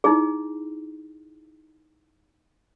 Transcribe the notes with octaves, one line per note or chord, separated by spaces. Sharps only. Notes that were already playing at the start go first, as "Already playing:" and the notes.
D#4 E4 G#4